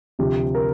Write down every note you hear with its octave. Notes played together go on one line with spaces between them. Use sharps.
D2 C3 F3 G4
A#4